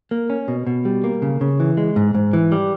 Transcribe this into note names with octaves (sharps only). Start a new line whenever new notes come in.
A#3
C#4
B2
B2
G3
A#3
C#3
C#3
E3
G#3
G#2
G#2
E3
G3